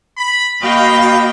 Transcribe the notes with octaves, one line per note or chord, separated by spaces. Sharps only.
B5
A#3 F#4 D#5 F5 G5 B5